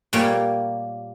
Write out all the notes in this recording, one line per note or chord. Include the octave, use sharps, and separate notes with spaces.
A#2 G3 A#3 C#5